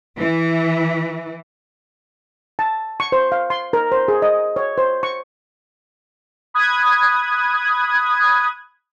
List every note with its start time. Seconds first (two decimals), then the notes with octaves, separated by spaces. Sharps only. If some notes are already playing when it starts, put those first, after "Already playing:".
0.18 E3
2.59 A5
3.00 C#6
3.12 C5
3.32 F5
3.50 C6
3.73 A#4
3.92 C5
4.08 G#4
4.22 D#5
4.56 C#5
4.78 C5
5.03 C#6
6.54 B5 D#6 F#6 G#6